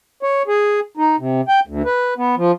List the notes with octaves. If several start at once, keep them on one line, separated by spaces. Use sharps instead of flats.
C#5
G#4
D#4
C3
G5
D2
B4
B3
F3